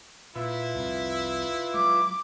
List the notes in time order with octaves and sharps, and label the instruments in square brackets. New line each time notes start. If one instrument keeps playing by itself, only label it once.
[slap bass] A#2 [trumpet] E4 [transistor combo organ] F4 B4 E5
[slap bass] C2 F2
[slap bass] F#3 G#3 [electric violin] D6